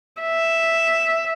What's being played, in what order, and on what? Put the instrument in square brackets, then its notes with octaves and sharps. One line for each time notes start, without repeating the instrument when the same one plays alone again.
[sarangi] E5